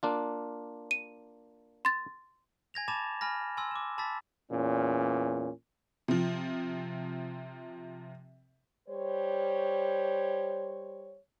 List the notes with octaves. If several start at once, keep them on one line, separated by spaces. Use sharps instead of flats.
A#3 D4 F4
D#7
C6 A6
G#5 G#6 A#6 F7
A5 B5 D6 A6 E7 F7
G#5 B5 F6 A#6
G#5 C6 E6
D6 E7
A5 B5 D6 E6 A6 B6
E2 A#2 C#4
C3 F3
G3 C5 C#5